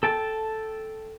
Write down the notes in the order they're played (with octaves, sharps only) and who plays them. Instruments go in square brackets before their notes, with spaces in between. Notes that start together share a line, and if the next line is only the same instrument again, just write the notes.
[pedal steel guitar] A4 G5 A5